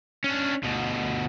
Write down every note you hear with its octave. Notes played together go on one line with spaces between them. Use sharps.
C#4 D4
D2 B2